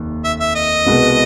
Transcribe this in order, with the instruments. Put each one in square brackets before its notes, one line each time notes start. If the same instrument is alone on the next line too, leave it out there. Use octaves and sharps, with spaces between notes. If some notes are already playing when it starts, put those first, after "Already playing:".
Already playing: [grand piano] F1 D#2
[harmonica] E5
E5
D#5
[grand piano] C2 B2 G#3 B3